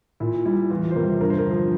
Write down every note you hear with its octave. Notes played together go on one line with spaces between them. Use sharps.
A#2 E4
G3 E4
E2 F4
C5
C3 G3 A#4
G2 A#4
C5
A#4
D3 F3